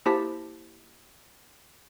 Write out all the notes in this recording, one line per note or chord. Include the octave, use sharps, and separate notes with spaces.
A#3 E4 G4 C5 A5 B6